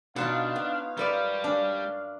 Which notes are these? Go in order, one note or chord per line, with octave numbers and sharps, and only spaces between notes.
B2 D4 D#4 F4 C#5 F5 F#5 A5
B3
F#2 G3 B4 D5
D4